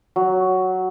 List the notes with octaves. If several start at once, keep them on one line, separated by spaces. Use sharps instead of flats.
F#3